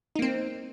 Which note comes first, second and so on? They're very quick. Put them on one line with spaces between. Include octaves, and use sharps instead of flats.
D#4 A#3 C4